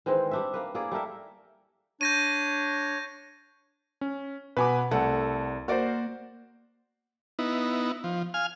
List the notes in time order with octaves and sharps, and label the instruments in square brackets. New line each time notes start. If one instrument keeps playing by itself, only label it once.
[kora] D#3 E3 G#3 C4
G3 D4 E5
A#3 B4
A#3 E4 G#4 D5
G3 A3 A#4 E5
[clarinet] D4 [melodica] C#5 [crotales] G6 A#6 D#7
[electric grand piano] C#4
[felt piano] B2 [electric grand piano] B4 G#5 D6 [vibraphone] F#5 B5
[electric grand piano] C2 [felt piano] A3 A4 F#5 [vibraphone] D5
[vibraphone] A#3 [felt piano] F#4 D5 [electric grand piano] A#4 C5
[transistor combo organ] B3 D#4 E4
F3
F5 G#5 F6